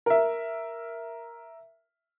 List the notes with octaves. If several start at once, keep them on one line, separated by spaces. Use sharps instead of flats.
A#4 E5